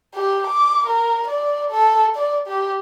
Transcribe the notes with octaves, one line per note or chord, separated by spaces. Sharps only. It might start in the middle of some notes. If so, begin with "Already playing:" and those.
G4
D6
A#4
D5
A4
D5
G4